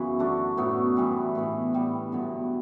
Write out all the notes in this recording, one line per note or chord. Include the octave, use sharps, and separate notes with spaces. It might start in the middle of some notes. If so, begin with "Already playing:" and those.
Already playing: F#2 C#3 E3 B3
D3 A3 D4 F#4
A2 F#3 B3
G2 E3 G3
A2 E3 B3
A2 G3 B3
G2 D3 F#3 B3